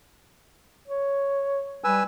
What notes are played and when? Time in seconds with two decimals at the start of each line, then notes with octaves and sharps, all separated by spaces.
0.88 C#5
1.84 G3 B4 G#5 E6